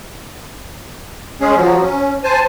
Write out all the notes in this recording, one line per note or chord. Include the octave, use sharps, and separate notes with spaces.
G#3 C#4 G#4
F3 F#3
C#4
C5 G#5 A5